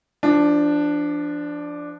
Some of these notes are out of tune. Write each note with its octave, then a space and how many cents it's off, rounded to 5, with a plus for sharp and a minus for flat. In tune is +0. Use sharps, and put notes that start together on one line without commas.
F3 -25 D4 +0